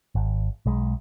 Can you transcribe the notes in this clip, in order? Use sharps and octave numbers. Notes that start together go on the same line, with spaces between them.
G#1
B1 G#3